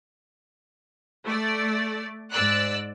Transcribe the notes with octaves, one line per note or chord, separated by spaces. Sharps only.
A3 D5
G#2 D5 E6 F#6